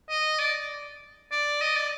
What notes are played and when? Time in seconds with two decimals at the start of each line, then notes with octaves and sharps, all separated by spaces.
0.10 D#5
0.40 D5
1.32 D5
1.62 D#5
1.76 D5